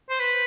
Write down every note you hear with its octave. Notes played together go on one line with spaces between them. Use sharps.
C5
B4